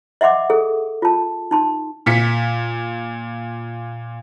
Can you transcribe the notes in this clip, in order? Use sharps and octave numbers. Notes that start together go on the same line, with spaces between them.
D#5 E5 F#5 C6 D6
G#4 A4
F4 A5
D#4 A5 C6
A#2 B6 C#7